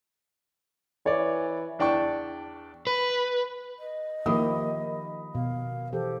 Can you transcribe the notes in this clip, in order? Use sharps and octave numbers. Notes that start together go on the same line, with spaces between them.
E3 C#5 D5
E2 D4 D5 G5 A5 C#6
B4
D#5
D#3 F3 A#3 E4 G4 A#4 B5 D#6
B2 F5
E3 G4 A4 C5